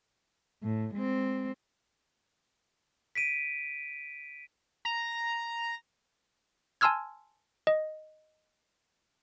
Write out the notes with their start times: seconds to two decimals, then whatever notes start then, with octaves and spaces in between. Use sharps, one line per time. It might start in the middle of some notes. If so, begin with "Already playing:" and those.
0.63 A2
0.94 G#3 C4
3.15 B6 D7 D#7
4.85 A#5
6.81 G#5 A5 C6 E6 F6 G#6
7.67 D#5